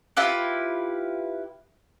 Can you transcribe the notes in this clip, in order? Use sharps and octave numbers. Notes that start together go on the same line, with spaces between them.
E4 F4 G4 B4